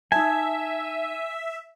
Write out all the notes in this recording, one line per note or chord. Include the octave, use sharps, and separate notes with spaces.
D#4 E5 G#5 A5